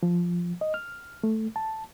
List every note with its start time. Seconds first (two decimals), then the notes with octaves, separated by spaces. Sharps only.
0.03 F3
0.61 D#5
0.74 F6
1.24 A3
1.56 A5